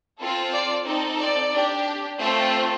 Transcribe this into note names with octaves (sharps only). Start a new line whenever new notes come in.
C4 F4 A4
D5
C4 D#4 A4
D5
D4 G4
A3 C4 F4 A4